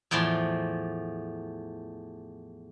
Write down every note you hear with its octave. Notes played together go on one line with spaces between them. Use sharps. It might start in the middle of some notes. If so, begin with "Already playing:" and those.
E2 A2 F3 D5 A5 C6